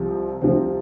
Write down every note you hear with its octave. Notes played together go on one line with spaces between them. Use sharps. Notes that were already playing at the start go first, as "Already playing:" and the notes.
Already playing: C2 C3 F3
C2 C3 F3 C4